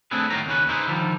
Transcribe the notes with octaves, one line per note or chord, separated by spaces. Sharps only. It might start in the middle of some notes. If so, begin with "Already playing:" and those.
A3 C4 D4 E4 G#4 B4
A2 D#3 F#3 F4 G4 A#5
D#2 C#3 C#4 B4
D#4 E4 G#4 B4 C5
D3 D#3 F3 G3